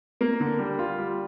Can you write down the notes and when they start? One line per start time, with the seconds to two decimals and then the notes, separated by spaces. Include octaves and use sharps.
0.21 A#3
0.40 D3
0.59 G3
0.79 F4
0.98 G3